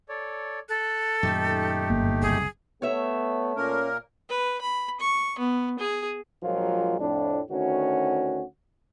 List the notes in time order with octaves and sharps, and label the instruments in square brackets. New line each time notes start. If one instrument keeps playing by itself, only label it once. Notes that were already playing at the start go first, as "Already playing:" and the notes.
[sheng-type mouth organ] A4 C#5 D5
[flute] A4 [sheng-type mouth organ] F#6
[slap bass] F#2 A#2 D#3 [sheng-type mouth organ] A3 D#4 G4
[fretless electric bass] G1 A#3
[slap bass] F#1 C2 [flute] G#4
[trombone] A3 [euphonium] B3 [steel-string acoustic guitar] C#5 E5
[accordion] A#2 A#3 A#4 [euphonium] C#4
[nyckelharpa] B4
B5
C#6
B3
G#4
[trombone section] A#1 F3 F#3 G#3 A#3 F4
F2 A2 D4
D2 D#3 C#4 F#4